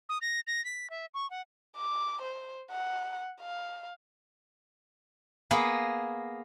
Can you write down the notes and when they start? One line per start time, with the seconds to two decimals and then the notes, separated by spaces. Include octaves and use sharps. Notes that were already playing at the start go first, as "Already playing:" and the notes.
0.09 D#6
0.21 A#6
0.47 A#6
0.65 B6
0.90 E5
1.14 C#6
1.30 F#5
1.77 D6
2.22 C5
2.71 F#5
3.41 F5
5.51 A#3 B3 G#4 C6